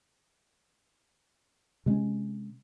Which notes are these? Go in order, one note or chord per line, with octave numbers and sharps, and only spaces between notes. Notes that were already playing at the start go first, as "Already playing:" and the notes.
C3 G#3 C4 C#4